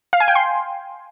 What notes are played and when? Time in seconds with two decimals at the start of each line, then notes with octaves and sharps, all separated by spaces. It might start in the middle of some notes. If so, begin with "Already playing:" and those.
0.13 F5
0.20 G#5
0.28 G5
0.35 C6